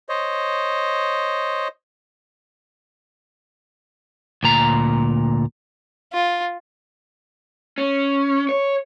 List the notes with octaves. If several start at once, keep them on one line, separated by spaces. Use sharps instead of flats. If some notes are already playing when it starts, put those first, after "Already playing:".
C5 C#5 D#5
D2 A#2 A#5
F4
C#4
C#5